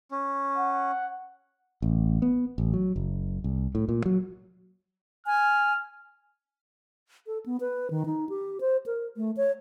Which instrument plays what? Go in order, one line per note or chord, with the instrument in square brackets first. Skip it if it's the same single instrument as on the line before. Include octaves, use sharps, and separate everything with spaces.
[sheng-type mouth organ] C#4
[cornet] F#5
[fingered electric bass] A1
B3
A1
F#3
F#1
C2
A2
A#2
F#3
[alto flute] G#5 [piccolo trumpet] F6
[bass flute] A4
B3
B4
D#3
D#4
G4
C5
A#4
A3
C#5